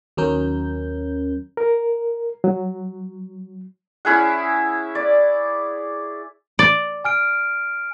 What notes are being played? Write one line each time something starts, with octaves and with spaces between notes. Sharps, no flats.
D#2 F#3 C#4 A#4 G6
A#4
F#3
C#4 E4 G#4 F#5
D5
D5
G#5 F6 D7